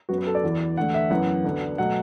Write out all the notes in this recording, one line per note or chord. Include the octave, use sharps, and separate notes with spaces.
F#2 F#3 B3 F#4
B4
A4
D5
E2 E3 B3
E2 D3 A3 F#5
E5
F#2 E3 B3 F#5
D2 D3 B3
B2 F#3 A3 F#5